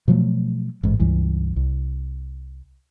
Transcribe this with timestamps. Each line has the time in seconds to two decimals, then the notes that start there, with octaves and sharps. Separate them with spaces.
0.08 B2 F3 F#3 A3
0.83 A1 G#2
1.00 C#2 G2 E3
1.56 C2